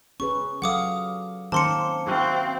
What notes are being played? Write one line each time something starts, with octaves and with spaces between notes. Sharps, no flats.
C#4 G#4 B4 C#6
F#3 A4 F5 F#5 D6 D#6
D#3 A#3 C4 C#4 A5 C6 C#7
C4 E4 F#4 F5